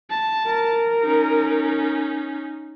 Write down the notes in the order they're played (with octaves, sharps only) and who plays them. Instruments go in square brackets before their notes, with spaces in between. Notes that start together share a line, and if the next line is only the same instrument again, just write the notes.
[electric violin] A5
[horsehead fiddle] A#4
[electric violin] C#4 D#4